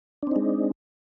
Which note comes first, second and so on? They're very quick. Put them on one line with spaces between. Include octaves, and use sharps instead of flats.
D4 C4 D#4 G#3